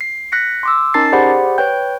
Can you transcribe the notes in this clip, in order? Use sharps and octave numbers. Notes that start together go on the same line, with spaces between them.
C7
F#6 A#6 B6 C#7
C6 D6 E6
C#4 D#4 A#4 A5 A6 C7
G4 G#4 C5 D5 F#5 B5
B4 C#5 G5 G6